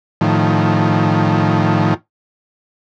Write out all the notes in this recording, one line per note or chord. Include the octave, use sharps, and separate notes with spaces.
A2 D#3 F3